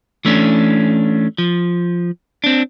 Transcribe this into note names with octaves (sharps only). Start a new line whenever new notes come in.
E3 A3 C#4 D4
F3
C4 D4